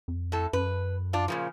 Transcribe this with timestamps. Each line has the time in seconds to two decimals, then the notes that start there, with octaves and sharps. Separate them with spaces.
0.08 F2
0.32 A2 A4
0.53 F#2 B4
1.13 D4 F4
1.28 A#2 C#3 F3